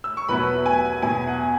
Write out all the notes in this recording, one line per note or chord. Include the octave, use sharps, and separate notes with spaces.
E6
C#6
E2 B2 F#3 B3 E4 B4 B5
G#5
E2 B2 B3 E4 G#5
F#5